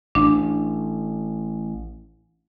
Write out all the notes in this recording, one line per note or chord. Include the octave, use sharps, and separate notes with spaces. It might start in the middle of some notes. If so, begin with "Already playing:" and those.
A1 D4